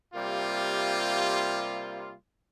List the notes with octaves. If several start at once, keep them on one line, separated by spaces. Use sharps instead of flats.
C3 G3 A#3 F4